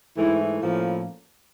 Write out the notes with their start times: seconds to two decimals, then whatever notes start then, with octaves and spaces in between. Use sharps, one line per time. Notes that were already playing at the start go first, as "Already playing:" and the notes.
0.17 G#2 E3 A3 E4
0.39 E4
0.60 A2 F3 A#3 C#4